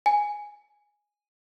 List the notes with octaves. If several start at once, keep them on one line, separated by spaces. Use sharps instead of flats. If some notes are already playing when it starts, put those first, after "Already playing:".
G#5